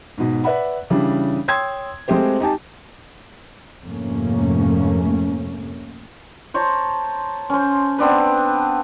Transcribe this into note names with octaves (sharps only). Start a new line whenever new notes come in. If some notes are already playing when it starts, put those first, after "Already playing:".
G#2 B2
B4 D5 E5 F#5 B5
C#3 E3 G3 D4
C#5 G5 C6 D#6 E6 G#6
G#3 A3 C4 G4 C5
D#4 G4 G#5 A5
F2 G#2 C3 A3 A#3 C#4
C5 C#5 A5 A#5
C#4 C5
B3 C4 D4 B4